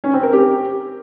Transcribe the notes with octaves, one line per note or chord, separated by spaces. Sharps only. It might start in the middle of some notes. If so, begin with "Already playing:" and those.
C#4
C4
A#4
G4